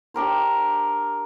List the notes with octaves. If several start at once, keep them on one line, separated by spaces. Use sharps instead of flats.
D4 G4 A#4 C5